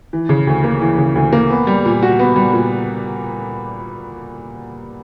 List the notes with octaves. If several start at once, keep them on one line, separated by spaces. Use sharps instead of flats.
E3
C#3
D2
A#3
E3
C#3
D2
A#3
B3
G3
A#2
F#4
B3
G3
A#2